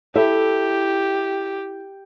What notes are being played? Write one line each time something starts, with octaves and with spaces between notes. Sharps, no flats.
E4 G4 A4 E5